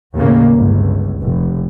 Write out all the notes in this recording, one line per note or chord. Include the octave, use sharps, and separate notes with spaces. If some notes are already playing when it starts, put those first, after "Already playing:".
D#2 A2 C#3 A#3
G1 C#2
F1